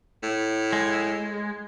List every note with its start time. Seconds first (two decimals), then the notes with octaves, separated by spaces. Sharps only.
0.23 A2
0.73 G#3